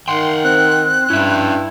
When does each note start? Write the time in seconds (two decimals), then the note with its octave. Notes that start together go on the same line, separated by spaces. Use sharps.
0.08 D#3 F#5 G5 C6
0.44 C4 F#6
1.10 G2 C#4 E4 E5